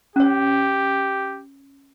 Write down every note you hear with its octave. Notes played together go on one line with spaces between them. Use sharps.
C#4 G4 C#5